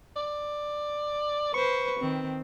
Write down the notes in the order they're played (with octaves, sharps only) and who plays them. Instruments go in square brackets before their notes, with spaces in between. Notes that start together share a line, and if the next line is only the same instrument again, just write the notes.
[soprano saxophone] D5
[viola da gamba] B4 C5 [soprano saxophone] C#6
[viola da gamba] D#3 C4